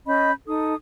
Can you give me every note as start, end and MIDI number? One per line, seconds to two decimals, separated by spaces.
0.06 0.31 61
0.06 0.31 75
0.06 0.31 83
0.06 0.31 91
0.47 0.74 63
0.47 0.74 69
0.47 0.74 87